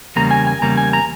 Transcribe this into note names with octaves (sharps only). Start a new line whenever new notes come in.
E2 C#3 G3 A#3 A#5
G#5
G#5
E2 C#3 G3 A#3 A#5
G#5
A#5